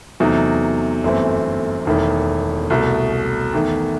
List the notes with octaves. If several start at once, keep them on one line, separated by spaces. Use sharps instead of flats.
E2 C3 F#3 A3 D#4
G1 F#2 E3 A3 C4
E1 E2 D#3 A3 E4
C2 B2 A3
E2 D#3 A3